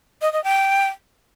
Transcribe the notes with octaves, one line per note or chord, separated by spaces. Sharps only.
D#5
D#5
G5